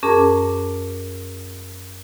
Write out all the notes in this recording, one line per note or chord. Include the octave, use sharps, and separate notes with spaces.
F#2 C#4 G#4 A#4 A5 D6